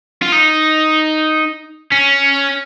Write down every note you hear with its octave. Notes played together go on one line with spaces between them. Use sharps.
F4
D#4
C#4